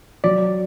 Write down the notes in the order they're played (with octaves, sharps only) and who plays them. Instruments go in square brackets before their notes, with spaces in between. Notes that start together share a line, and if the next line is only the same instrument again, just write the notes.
[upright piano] F#3 [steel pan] D5